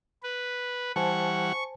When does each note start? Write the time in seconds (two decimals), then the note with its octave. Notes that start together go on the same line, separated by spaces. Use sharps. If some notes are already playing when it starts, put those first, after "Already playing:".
0.23 B4
0.96 E3 G3 C5 F#5 G#5 A5 C#6